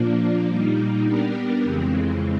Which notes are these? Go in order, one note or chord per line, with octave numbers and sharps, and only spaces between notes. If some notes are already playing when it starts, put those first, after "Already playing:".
Already playing: A#2 F3 A#3 D4
A#2 G3 A#3 D#4
G3 B3 D4 G4 A#4
F2 C#3 E3 G#3 C4